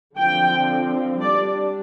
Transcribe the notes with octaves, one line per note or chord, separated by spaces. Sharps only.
D3 F3 C4 G5
G3 D4 D5